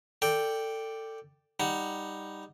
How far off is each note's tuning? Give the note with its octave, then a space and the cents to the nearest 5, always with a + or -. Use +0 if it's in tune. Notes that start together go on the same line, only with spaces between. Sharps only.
A4 +20 D5 +0 G5 +0
G3 +10 D#4 +0 F#5 +0